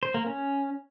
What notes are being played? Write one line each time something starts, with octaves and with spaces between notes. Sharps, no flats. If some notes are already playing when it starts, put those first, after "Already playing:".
C5
A#3
C#4